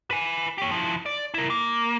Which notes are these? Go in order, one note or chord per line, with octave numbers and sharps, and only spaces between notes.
B4 G#5
G4 C#5
F3 E4
D5
E4 A#4
A#3